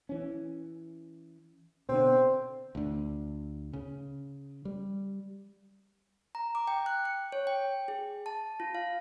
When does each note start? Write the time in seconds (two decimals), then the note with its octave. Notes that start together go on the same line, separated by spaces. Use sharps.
0.09 E3 C#4
1.89 B2 D3 C4
2.75 D2 D3
3.73 C#3
4.65 G3
6.35 A#5
6.55 D6
6.67 G5
6.86 F#6
7.05 C#7
7.32 C#5
7.47 G5
7.88 G#4
8.26 A5
8.60 F4
8.75 F5